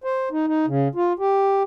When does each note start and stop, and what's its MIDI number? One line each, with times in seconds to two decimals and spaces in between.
0.04 0.29 72
0.31 0.47 63
0.47 0.66 63
0.67 0.88 49
0.95 1.13 65
1.19 1.63 67